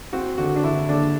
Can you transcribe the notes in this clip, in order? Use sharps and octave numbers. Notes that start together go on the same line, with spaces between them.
C4 F#4
D3 F#4
D4
D3 E4
D3 D4